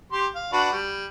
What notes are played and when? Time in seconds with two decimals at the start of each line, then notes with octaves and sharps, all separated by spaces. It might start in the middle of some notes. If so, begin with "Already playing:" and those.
0.12 G4 C6
0.35 F5
0.52 D4 F#4 B4
0.72 G3